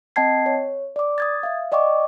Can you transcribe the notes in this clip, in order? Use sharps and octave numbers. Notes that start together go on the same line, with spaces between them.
C4 D#5 G5 A5 G#6 C7
C#5
D5 D6
D#6 G#6 A6
E5 F5
D5 D#5 G5 C#6 D6